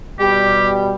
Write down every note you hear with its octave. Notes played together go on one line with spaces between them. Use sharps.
B2 G3 G4